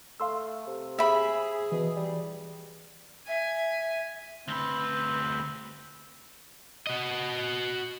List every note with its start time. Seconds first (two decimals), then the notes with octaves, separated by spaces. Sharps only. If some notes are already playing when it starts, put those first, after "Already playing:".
0.20 A3 F5 C6 E6
0.67 C3
0.99 G#4 E5 B5
1.72 B2 E3
1.96 G3
3.28 E5 G#5
4.49 D2 C4 B4
6.87 F#4 D#5